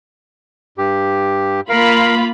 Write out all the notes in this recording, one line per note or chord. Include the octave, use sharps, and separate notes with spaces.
G2 G4
A#3 F4 A#4 F5 B5